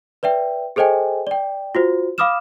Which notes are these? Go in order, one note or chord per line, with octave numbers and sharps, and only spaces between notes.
B4 D5 E5 G5
G#4 A4 C5 D#5 G5 G#5
D5 G5
F4 F#4 C5
F5 B5 D6 D#6 F6 E7